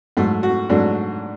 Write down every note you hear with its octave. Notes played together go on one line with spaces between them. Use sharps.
G#2 F#3 A3 A4
F#4
G#2 F#3 A3 D4